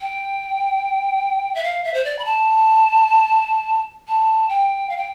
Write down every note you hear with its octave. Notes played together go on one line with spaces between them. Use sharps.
G5
E5
F5
E5
C5
D5
B5
A5
A5
G5
F5
G5